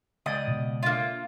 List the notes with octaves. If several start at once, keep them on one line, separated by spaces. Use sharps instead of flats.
C#2 D5 D#5 D#6
B2
A#3 D4 F4 E5 C6